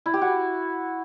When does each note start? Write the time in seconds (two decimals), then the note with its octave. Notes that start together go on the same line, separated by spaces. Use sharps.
0.06 E4
0.14 G4
0.21 F#4